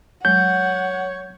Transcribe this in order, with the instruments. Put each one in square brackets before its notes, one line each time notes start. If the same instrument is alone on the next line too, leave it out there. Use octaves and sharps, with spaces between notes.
[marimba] F#3 G#3 [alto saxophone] C#5 [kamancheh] F#5 [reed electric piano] G6